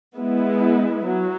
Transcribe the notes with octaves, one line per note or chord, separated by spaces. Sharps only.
G#3 B3 E4
F#3